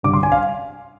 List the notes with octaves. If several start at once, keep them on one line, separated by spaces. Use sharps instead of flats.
G2 D3 G3 D6
C6
G#5
F5